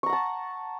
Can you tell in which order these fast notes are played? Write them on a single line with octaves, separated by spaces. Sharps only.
C#6 A#5 F#5 A5